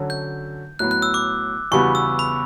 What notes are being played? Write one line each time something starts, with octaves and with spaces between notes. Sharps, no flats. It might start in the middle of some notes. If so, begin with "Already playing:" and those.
Already playing: D3 F#3 C#4 F#4 A4
G6
A2 F#3 B3 F#6
F#6
E6
D6
E2 C#3 G3 B3 F#4 C#6
E6
B5